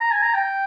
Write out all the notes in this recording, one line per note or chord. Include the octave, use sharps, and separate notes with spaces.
A#5
G#5
A#5
G5